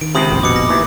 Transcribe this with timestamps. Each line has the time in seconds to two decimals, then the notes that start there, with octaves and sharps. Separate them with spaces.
0.01 D#3 D7
0.15 C#2 C3 B5 D#6 F#7
0.30 F1 A#1
0.43 B2 D6 D#6 C#7
0.56 A#6
0.69 D#2 E3